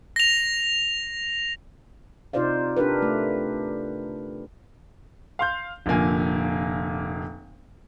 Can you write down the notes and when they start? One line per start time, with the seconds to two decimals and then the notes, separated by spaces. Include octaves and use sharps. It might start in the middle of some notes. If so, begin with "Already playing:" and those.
0.16 A#6 F7
2.33 C3 D#4 F4 C5 D5 F5
2.77 D4 G4 A#4 B4
3.02 A3
5.39 F5 C6 G6
5.86 F1 A#2 D3 A#3 G#5